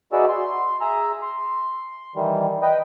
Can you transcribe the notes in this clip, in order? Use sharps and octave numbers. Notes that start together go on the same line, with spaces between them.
B3 D#4 F#4 G#4 D5 E5
C6
G#4 E5 A#5
C6
D#3 E3 G3
B4 D#5 G5